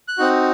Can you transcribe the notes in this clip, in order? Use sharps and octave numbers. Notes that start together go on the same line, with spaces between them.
F#6
C4 D#4 F#4